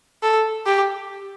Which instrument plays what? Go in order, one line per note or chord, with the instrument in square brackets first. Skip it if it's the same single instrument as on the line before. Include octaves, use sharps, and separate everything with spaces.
[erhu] A4
G4